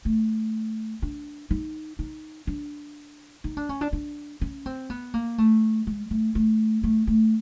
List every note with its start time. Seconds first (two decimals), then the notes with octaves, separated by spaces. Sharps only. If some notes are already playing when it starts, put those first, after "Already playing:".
0.05 A3
1.02 D4
1.50 D#4
1.99 D#4
2.47 D4
3.44 D#4
3.57 D4
3.69 C#4
3.81 D4
3.93 D4
4.41 C#4
4.66 C4
4.90 B3
5.14 A#3
5.38 A3
5.87 G#3
6.11 A3
6.35 A3
6.83 A3
7.07 A3